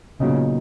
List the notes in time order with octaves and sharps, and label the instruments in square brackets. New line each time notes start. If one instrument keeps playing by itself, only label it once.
[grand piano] A#2 F#3 B3 D#4 [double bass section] C#3